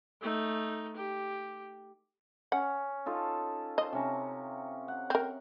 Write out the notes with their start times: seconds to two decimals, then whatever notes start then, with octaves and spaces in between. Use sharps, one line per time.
0.22 A3 D#4
0.96 G4
2.52 C#4 F#5
3.06 D#4 F4 A4
3.78 C5 D#5 A5
3.92 C3 C#4 A#5
4.88 F#5
5.10 C4 A#4